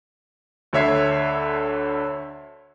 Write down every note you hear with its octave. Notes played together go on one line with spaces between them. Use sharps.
D2 D3 C#5 E5 G#6 C7